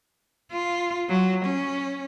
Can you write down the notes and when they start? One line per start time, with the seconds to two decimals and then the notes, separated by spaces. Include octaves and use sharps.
0.51 F4
1.09 F#3
1.45 C#4